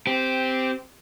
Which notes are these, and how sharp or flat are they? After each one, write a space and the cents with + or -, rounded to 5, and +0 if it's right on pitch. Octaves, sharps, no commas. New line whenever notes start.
C4 -10 G4 +0